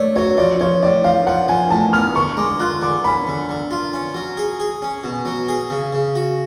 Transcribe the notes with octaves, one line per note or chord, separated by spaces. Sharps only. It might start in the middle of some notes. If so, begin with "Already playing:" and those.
Already playing: A3 C#5 D5
F#3 C#5
F3 D5
F3 C#5
A2 D5
F3 F5
F3 F#5
F3 G#5
A2 A5
B3 F6
D3 C#6
G#3 D6
F4 F#6
D3 D6
C#4 B5
D3
D3
F4
C#4
F#3
G#4
G#4
C#4
B2
F#3
G#4
C#3
C#3
F#4